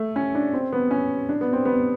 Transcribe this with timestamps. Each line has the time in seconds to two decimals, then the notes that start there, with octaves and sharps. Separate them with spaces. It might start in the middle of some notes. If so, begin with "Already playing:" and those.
Already playing: A3
0.16 C#4
0.35 D4
0.53 C4
0.72 B3
0.91 C#4
1.29 D4
1.41 B3
1.53 C4
1.65 B3